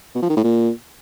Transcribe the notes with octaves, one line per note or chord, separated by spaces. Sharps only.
B2
F3
D#3
A2
A#2